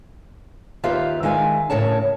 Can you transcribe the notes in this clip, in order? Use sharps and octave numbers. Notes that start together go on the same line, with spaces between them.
D#2 F4 G4 B4 E5 F5
D#3 G#3 E5 F5 G#5
A2 C#3 A#4 C#5 A5